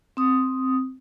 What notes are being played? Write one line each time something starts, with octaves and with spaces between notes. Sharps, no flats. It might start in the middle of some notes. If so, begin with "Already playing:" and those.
C4 D#6